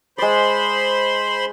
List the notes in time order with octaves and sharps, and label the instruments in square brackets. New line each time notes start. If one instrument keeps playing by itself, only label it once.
[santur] G#3 D5 [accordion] C5 B5 C6